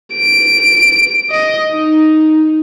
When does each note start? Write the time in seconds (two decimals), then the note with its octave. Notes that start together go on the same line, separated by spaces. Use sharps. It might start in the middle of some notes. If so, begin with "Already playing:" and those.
0.14 D7
1.31 D#5
1.73 D#4